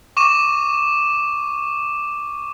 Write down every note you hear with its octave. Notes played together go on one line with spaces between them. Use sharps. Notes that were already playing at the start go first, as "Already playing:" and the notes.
C#6 D6 D#7 E7